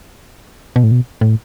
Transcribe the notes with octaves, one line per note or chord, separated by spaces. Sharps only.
B2
A2
B2
A2